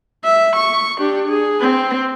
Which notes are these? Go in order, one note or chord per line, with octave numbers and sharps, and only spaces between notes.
E5
C#6
D4 G4
G#4
C4